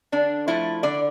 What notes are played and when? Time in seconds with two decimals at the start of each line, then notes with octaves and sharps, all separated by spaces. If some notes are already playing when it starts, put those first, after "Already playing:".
0.12 D3 D4
0.48 F3 A3 E4
0.83 D3 D5